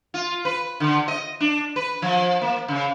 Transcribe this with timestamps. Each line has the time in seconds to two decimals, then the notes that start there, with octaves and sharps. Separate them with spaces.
0.14 F4
0.45 B4
0.80 D3
1.08 D#5
1.40 D4
1.76 B4
2.02 F3
2.42 A#3
2.68 C#3